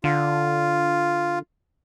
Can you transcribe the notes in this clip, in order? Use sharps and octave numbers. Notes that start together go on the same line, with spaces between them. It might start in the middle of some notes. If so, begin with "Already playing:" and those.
D3 F4